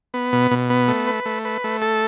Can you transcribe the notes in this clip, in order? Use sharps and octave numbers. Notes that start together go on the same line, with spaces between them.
B3
B2
B2
B3
A3
B4
A3
B4
A3
A4